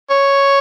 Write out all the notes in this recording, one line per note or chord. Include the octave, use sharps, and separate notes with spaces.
C#5